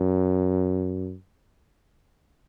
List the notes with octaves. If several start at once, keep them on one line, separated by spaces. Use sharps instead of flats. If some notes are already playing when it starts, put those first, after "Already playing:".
Already playing: F#2